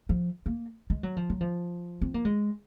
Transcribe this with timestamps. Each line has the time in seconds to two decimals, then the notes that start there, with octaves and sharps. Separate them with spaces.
0.09 F3
0.46 A#3
0.90 G#3
1.03 F#3
1.17 F3
1.30 F#3
1.41 F3
2.01 C4
2.14 A#3
2.25 G#3